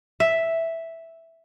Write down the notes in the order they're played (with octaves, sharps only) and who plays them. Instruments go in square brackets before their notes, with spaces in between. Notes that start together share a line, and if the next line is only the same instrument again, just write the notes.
[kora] E5